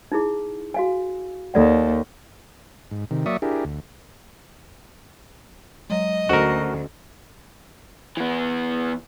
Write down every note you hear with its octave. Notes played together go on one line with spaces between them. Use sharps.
D#4 E4 G#4
F#4 F5 G#5
D#2 A4 D5 F#5
G#2
C3 D#3
F#3 A#3 D5 E5 C#6 D#6
D4 E4 G4 G#4 A#4
D2
F#3 G#3 D#5
D2 C#4 F#4 A4 A#4 C5
E3 B3